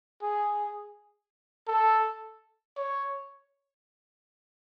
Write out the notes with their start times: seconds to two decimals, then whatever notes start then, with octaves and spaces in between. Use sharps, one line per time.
0.22 G#4
1.68 A4
2.77 C#5